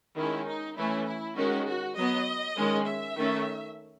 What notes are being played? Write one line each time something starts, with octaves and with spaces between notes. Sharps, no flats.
D#3 G#3 C#4 E4
D#4
E3 A3 C#4 E4
E4
D#3 G#3 C#4 F#4
F#4
F#3 B3 D#5
D#3 G#3 C#4
E5
D#3 A3 C#4